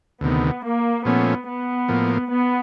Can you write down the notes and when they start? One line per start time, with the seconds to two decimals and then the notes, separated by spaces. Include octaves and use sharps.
0.21 D2 C3 D#3 B3
0.64 A#3
1.05 A#2 F3 A3 B3 C#4
1.47 B3
1.88 A2 F3 A#3
2.30 B3